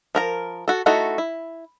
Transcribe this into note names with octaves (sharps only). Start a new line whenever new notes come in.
F3 A#4 A#5
F#4 A4
A3 D#4 E4 F#4 A4
E4